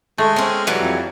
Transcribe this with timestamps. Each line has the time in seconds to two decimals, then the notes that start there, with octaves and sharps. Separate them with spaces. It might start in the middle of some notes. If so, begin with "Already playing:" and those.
0.18 G#3 A3
0.36 C4 C#4
0.67 E3 F#3 G3
0.79 F2